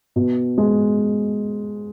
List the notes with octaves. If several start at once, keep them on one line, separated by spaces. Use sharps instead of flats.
B2
G#3